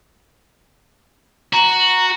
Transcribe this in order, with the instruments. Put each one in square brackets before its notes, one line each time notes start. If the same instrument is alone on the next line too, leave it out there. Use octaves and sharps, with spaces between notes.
[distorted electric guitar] F#4 [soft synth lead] A#5